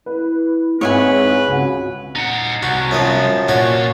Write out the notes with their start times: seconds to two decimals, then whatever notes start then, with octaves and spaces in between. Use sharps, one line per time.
0.06 E4 B4
0.81 G#2 C4 B4 C#5 E5 G#5
1.48 C#2 F#4
2.16 D#4 F#5
2.63 C2 F#4
2.91 F#2 F3 D#6
3.49 A#2 F#4 C#5